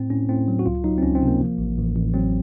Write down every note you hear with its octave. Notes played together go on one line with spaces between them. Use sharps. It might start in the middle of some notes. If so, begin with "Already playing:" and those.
Already playing: A2 C4
A2 C#4
A2 C4
F#3
F#4
C#2 F4
F#3 D#4
C4
C#2 C#4
C4
C3
A#3
F3
A1
A1
A1
F#3 C4